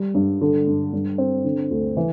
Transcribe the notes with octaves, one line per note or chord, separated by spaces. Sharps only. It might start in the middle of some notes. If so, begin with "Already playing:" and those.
Already playing: G3
G2
D3
G2
G2
C4
D3
D2
E3